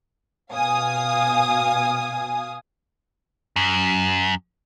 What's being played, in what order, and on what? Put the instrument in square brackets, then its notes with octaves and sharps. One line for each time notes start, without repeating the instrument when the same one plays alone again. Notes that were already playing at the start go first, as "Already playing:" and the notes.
[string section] B2 F5 G#5 D#6
[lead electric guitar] F#2